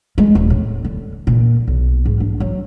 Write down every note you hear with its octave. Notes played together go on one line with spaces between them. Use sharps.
G#3
D#1
A2
D3
A#2
B1
G#2
D4
F#3